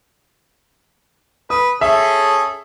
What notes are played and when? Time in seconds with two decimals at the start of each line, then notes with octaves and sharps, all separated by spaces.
1.50 B4 D#6
1.81 C#4 G#4 A4 E5